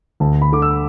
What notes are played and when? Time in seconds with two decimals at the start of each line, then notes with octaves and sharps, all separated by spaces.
0.20 D2 A5
0.42 B5
0.52 D3 D6
0.62 E6